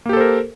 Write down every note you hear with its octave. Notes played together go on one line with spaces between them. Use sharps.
A#3 G4 A4 A#4 C5